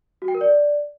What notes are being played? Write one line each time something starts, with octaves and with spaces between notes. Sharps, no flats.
F#4
G5
A#4
D5